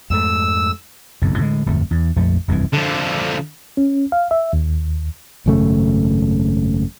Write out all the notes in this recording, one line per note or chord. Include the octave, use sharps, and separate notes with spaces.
F2 G#2 A3 E6
F#1 B1 F2
A2 D3 D#3 G#3
D1 G1 F2 A3
E2
A#1 F2 F3 A3
F1 C2 G2 E3
D3 F3
C#4
F5
E5
D#2
G#1 F#2 C#3 A3